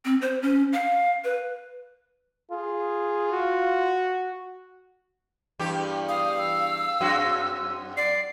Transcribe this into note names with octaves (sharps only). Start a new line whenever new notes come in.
C4
C5
C#4
F5
B4
F4 G#4
F#4
E2 G2 G4
F5 D#6
E6
F#2 C4 F#4
D5 C7